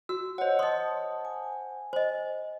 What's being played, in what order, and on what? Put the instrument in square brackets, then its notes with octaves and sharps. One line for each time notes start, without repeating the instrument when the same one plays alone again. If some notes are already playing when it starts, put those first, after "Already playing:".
[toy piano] F#4 [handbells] E6
[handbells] C5 F#5 [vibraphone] C#5 D#5
[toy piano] D#5 C6 [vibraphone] A5 D#6
[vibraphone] G#5
[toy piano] C5 D#5